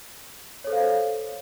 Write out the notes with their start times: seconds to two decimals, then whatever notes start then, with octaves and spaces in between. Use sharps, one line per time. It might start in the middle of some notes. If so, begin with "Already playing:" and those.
0.64 C#5
0.67 A4
0.70 C5
0.72 F5